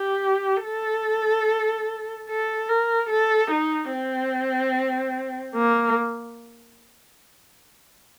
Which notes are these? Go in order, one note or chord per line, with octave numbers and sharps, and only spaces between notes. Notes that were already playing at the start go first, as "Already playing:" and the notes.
Already playing: G4
A4
A4
A#4
A4
D#4
C4
A#3